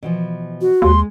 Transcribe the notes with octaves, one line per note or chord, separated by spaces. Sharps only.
B2 E3 F3
F#4
D#2 G#3 C6